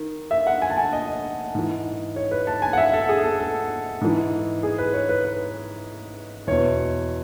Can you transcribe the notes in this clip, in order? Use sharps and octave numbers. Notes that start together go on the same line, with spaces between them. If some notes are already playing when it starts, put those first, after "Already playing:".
Already playing: D#3
E5
F#5
G#5
A5
G#5
D#5
G#2 E3
C#5
B4
A5
G#5
F#5
E5
A4
G#4
A4
A4
G#2 E3
G#4
B4
C#5
B4
B4
E2 B2 C#5